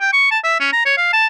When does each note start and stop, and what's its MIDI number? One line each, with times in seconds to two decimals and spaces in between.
0.01 0.10 79
0.13 0.26 85
0.31 0.39 81
0.44 0.55 76
0.60 0.72 61
0.73 0.83 82
0.85 0.96 73
0.97 1.09 77
1.13 1.27 81